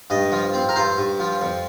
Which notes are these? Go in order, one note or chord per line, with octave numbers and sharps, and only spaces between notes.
G2 D#5
F3
C4
A#4
G2 C5
G2
F3
F2